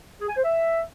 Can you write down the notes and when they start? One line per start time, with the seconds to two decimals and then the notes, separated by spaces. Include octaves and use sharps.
0.21 G#4
0.29 G#5
0.37 C5
0.45 E5